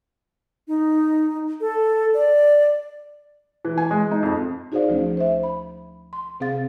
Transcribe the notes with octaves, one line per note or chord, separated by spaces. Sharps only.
D#4
A4
D5
E3
G#5
G#3
D#4
F2
D#4 F#4 G#4 C5 D5 F5
D2 F3 A3 C#4
C5 E5
B5
C6
C3 C4 G#4 F5 A6